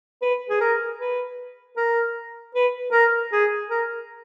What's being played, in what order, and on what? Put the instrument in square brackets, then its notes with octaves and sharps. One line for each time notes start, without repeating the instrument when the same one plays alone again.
[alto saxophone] B4
G#4
A#4
B4
A#4
B4
A#4
G#4
A#4